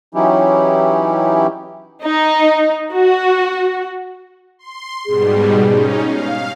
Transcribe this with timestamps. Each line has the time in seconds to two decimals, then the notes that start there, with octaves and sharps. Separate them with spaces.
0.15 E3 F#3 C#4 D#4 E4 G4
2.02 D#4
2.92 F#4
4.59 C6
5.06 G#2 B2 G3 G#4
5.66 C#4 D#4
6.02 F5